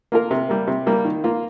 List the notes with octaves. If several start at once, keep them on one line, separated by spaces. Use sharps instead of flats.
A#3 F4 A#4
C3
G3 A#3
C3
G3 A#3
D#3
A#3 F4